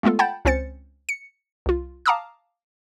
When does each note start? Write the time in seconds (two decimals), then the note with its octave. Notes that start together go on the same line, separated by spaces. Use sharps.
0.03 G#3 A3 B3 F4 A4
0.19 F#5 G5 A5 B5 G6 A6
0.45 C#2 C4 C#4 C5 A6 C#7
1.09 C#7
1.66 C2 F4
2.06 F5 A5 A#5 D6 D#6 F6